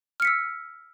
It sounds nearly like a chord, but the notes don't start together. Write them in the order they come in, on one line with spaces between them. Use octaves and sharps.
F6 C#7 B6 E6